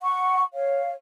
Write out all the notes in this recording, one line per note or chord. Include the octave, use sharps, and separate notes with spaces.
F#5 C#6
C#5 F5